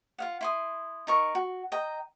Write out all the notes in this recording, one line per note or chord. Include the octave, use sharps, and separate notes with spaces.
F4 F5 F#5
E4 C6 D#6
D#4 A#4 C#6
F#4
D#5 G5 A#5